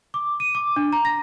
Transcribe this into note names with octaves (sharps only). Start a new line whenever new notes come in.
D6
D#7
D6
D4
A#5
A#6